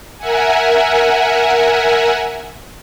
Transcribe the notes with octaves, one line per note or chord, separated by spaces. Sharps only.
A#4 E5 F#5 G#5